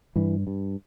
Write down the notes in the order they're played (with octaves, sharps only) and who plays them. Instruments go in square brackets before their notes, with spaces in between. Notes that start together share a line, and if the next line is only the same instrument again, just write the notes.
[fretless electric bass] G2 E3
G2